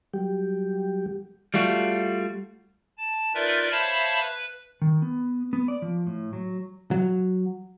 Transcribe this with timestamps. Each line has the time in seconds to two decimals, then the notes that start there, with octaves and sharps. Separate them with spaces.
0.14 F#3 G3 G4
1.54 G3 A3 F4 F#4
2.97 A5
3.34 D#4 F4 A#4 B4 D5 E5
3.71 C5 C#5 E5 F5 A5 B5
4.21 B4
4.82 D#3
5.02 B3
5.53 B3
5.68 D5
5.82 F3
6.06 A2
6.33 F#3
6.91 F#3